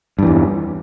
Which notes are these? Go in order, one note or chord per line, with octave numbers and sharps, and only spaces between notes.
E2 G2 E3